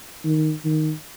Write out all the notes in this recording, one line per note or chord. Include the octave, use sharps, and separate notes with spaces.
D#3
D#3